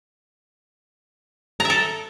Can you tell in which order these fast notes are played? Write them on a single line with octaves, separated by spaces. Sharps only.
A#5 E5 A4